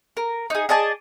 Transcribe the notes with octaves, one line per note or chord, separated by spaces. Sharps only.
A#4
D#4 G#4
G#4 D5 D#5 A5